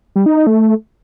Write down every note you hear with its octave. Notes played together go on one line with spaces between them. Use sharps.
G3
D#4
D#4
A3